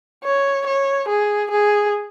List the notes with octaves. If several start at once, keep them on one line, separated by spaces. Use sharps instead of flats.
C#5
C#5
G#4
G#4